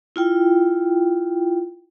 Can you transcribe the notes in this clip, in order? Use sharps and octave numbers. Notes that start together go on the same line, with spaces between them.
E4 F4 G5